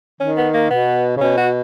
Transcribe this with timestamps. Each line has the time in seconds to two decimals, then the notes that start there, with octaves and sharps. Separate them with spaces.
0.20 D#3 C#4
0.37 B3
0.54 A#3
0.71 B2 B3
1.17 C#3
1.21 B2 C#4
1.37 F#4